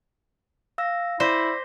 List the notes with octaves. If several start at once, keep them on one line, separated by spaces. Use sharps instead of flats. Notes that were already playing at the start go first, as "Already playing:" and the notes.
F5 E6 A#6
E4 C5 D5 A#6 B6